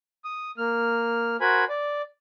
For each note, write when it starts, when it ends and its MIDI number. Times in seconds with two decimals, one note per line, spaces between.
0.24 0.51 87
0.58 1.37 58
0.58 1.37 89
1.41 1.65 66
1.41 1.65 70
1.41 1.65 72
1.41 1.65 80
1.41 1.65 83
1.69 2.02 74